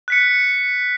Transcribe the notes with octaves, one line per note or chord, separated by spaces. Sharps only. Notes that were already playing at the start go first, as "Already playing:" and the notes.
F#6 B6 C#7